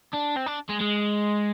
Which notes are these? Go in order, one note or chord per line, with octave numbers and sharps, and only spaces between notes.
D4
C4
D4
G#3
G#3